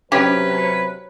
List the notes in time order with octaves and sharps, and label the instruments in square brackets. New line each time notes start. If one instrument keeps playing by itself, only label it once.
[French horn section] C3 F#3 C5 [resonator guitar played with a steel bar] C#4 [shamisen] G4 G5 [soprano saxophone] B4